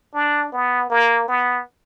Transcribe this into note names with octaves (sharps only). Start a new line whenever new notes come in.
D4
B3
A#3
B3